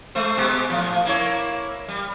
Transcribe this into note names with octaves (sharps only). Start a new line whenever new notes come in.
G#3 A3 C5
B2 G#3 G4
A2 F3
A#3 E4 C#5
G3